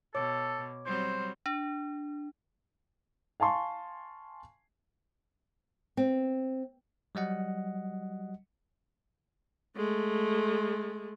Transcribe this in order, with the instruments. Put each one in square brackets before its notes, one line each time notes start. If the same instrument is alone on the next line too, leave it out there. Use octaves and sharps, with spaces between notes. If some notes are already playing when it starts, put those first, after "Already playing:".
[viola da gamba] B2 [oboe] A4 [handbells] C#5 D6
[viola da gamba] F#3 G3 C4 [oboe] C5
[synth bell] D4
[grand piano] F5 G#5 A5 C6 C#6
[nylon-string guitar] C4
[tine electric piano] F#3 G3 D#5 F#5
[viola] G#3 A3